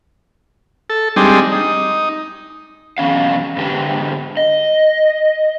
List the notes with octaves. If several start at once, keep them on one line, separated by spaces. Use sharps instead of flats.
A4
G3 G#3 C4 D4 D#4
D#4
F#2 B2 E3 C#4 F5
G#2 D3 G4 B4
D#5